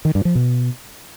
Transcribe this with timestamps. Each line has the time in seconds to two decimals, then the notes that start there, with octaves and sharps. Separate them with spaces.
0.05 D#3
0.15 G2
0.25 F3
0.35 B2